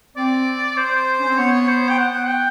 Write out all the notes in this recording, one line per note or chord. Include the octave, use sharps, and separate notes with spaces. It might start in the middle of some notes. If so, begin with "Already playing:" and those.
C4 D5
C5
C#4
C4
B3 C#5
C5
G5
F#5
G5